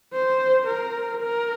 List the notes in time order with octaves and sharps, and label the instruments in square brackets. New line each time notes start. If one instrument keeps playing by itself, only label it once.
[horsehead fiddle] C5
A#4
A#4